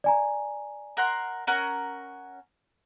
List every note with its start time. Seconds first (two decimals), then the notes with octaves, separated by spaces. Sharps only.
0.04 D5 G#5 A#5
0.97 A#4 F#5 C6
1.47 C#4 A#4 F#5